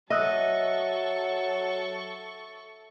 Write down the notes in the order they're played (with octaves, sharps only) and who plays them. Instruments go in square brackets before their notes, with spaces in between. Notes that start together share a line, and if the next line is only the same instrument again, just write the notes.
[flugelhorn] F#3 [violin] A4 C#6 [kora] D#5 [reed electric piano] E5 E6 F#6